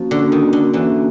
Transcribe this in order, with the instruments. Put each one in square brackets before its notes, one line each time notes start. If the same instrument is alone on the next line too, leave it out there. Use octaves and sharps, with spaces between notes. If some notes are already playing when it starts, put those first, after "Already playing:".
Already playing: [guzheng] F3 [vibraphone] A#3 C#4 F#4
[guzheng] D3 [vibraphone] A#3 C#4 F#4
[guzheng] D#3
D3
[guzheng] D3 E3 [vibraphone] A#3 C#4 F#4